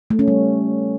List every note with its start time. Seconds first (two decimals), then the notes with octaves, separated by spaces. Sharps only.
0.10 A3
0.19 C#4
0.28 G3